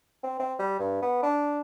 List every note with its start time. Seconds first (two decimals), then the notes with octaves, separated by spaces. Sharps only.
0.23 C4
0.39 C4
0.59 G3
0.79 G2
1.02 B3
1.22 D4